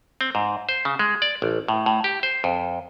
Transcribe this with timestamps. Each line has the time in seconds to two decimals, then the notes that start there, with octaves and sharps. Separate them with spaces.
0.21 C4
0.35 G#2
0.69 C5
0.85 C#3
0.99 G#3
1.22 D5
1.42 A1
1.68 A2
1.86 A2
2.04 G4
2.23 C5
2.44 F2